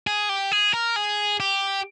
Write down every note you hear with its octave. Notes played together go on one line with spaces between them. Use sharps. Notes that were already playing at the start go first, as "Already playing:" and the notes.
G#4
G4
G#4
A#4
G#4
G4